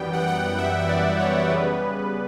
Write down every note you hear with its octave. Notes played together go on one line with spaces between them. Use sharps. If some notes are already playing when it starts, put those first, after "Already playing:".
Already playing: F#2 E3 G3 B3 G5
F#5
G5
F#5
E5
E5
D5
C#5
C#3 G3 B3 B4